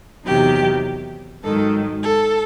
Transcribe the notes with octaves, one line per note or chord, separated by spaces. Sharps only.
E2 C3 D#3 F#3 G4
G#2 D#3 F#3 A4
A4